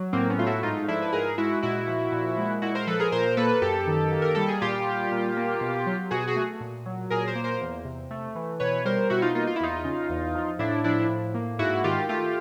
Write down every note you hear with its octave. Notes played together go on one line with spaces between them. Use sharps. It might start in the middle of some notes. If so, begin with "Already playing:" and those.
Already playing: F#3
A2 A#3 C4
B3 C#4
A3 F4
E4 F#4
G#2 D#4 F4
F3 D4 E4
B4
G#2 G#4 A#4
G#3 E4 F#4
A#2 E4 F#4
F3
A#2
G#3
A#2 E4 F#4
A#4 C5
F3 A4 B4
G#4 A#4
A#2 A#4 C5
A#3 A4 B4
F#2 G4 A4
D#3
A#3
A#4
G3 A4
G#4
A#2 F4 G4
G3
A#2
A#3
B2
F#3
B2 F#4 G#4
F#4 G#4
A3
A#2
F#3
A#2 G#4 A#4
A#4 C5
A#3
A#4 C5
E2
C3
A3
E3
B2 B4 C#5
G3 A#4 C5
B2 E4 F#4
D#4 F4
A#3 D#4 F4
F4
E4
E2 D#4 F4
C#3
E2
F3
A2 D4 E4
F3 D4 E4
A2
A#3
G#2 E4 F#4
D#3 F4 G4
A3 F4 G4